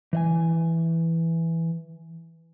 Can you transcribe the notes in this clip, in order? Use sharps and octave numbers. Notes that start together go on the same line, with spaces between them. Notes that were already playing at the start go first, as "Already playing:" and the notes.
E3 D#5 G#5